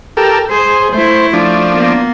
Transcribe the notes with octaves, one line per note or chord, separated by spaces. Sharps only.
G4 A4 A#4
G#4 C5
A3 E4 C5
F3 A3 D4
A#3 B3